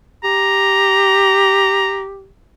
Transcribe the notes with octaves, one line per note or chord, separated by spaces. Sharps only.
G4 A#5